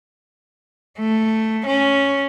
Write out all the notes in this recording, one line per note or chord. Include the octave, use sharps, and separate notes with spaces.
A3
C#4